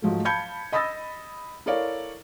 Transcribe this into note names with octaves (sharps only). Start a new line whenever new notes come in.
G#2 F3 F#3 A3
F5 A5 B5 G6 G#6 C#7
D#5 B5 D#6 E6 A6 A#6
E4 A4 A#4 C#5 D5 F5